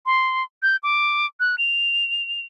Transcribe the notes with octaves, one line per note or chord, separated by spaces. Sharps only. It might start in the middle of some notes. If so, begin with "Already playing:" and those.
C6
G6
D6
F#6
F7